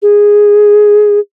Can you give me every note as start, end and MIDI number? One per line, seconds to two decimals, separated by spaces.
0.02 1.19 68